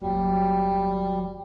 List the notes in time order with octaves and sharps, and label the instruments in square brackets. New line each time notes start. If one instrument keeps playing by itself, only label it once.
[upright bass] F#1 D#2 [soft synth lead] F#3 [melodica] G3